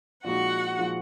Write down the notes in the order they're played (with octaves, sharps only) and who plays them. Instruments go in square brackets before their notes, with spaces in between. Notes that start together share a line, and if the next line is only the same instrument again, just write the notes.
[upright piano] A#2 F3 G#3 D#4 [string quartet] F#4 F#5
[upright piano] A#2 F3 G#3 D#4